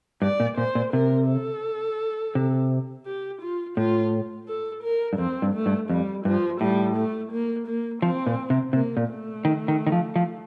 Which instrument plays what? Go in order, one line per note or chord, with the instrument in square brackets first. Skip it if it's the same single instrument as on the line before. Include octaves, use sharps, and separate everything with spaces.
[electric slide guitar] G2 [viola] D5
[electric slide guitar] A#2
[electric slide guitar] A#2 [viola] C5
[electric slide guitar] A#2
[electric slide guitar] C3 [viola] A#4
[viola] A4
[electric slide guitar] C3
[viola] G4
F4
[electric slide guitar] A2 [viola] F4
[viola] A4
A#4
[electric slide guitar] G2
[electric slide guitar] F2 [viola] C4
[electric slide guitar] G2
[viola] A3
[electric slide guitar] G2
[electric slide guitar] F2 [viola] G3
[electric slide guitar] G2 [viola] F3
[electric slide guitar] A2 [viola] G3
[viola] A3
A#3
A#3
[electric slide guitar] F3 [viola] C4
[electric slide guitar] A#2
C3
[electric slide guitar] C3 [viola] A#3
[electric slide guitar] A#2
[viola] A3
[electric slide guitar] D#3
D#3
D#3
F3
F3